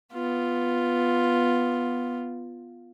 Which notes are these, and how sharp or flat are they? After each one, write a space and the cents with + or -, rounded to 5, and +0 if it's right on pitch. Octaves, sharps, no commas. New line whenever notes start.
B3 +0 F4 +0